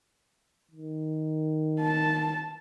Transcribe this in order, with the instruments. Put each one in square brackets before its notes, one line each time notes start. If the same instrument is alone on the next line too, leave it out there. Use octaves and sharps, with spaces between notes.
[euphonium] D#3
[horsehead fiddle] A5